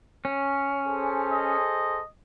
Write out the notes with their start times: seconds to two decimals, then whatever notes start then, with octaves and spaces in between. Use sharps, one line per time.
0.25 C#4
0.85 G#4 A4 C5
1.33 D#5